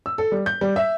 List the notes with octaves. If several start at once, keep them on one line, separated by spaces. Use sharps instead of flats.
E6
A4
G3
G6
G3
E5